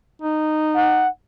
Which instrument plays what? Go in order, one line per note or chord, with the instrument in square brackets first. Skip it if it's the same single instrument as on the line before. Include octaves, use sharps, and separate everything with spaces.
[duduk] D#4
[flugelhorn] F#5